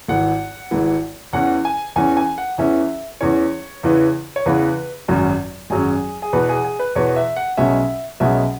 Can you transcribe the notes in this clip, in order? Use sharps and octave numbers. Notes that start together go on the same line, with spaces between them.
G#1 G#2 E3 F#5
G#1 G#2 E3
E2 E3 C#4 F#5
G#5
E2 E3 C#4 G#5
G#5
F#5
E2 E3 C#4 E5
E2 E3 C#4 C#5
E2 C#3 E3 B3
C#5
E2 C#3 E3 B3 B4
G#1 F#2 F#3 C#4
G#1 F#2 F#3 C#4 G#4
G#4
E2 B2 B3 B4
G#4
G#4
B4
E2 B2 B3 C#5
E5
F#5
B1 B2 G#3 C#4 E5
B1 B2 G#3 C#4 E5